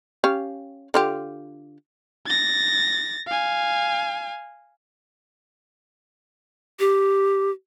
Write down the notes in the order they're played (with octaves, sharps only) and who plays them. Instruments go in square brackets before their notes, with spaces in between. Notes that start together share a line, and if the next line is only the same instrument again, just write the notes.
[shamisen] C#4 G4 F5
D3 F4 G4
[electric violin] A6 A#6
F5 G#5
[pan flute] G4